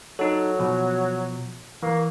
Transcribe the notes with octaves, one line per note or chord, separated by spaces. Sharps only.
F#3 D#4 A4
B2 F3
E3 A#3